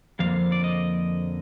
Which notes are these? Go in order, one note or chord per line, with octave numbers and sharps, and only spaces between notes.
F2 D3 F3 A#3 F5
D5
D#5